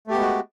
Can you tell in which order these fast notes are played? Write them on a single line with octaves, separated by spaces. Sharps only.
A3 G4 B3 G#3 F#4